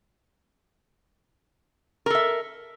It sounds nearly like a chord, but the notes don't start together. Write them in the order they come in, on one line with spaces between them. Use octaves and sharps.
A#4 A4 E5